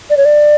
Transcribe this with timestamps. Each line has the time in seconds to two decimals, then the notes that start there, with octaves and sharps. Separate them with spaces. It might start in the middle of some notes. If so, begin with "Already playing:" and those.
0.10 D5
0.17 C#5
0.25 D5